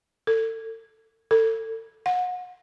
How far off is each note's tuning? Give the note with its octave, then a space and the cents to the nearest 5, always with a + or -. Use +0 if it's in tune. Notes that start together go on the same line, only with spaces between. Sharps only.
A4 +40
A4 +40
F#5 -35